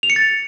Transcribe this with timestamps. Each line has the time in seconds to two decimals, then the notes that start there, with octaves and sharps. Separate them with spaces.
0.03 F7
0.10 C#7
0.16 A6